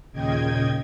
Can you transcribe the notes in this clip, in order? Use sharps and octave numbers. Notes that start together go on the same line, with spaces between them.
D#2 A#2 C#3 D#5 G5 G#6